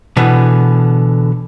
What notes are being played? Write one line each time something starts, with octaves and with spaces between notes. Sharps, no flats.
B2 D3 E3 B3